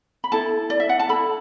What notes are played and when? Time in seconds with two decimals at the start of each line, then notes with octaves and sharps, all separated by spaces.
0.24 B5
0.32 E4 A4 A5
0.70 D5
0.80 E5
0.89 F#5
0.99 A5
1.09 E4 A4 B5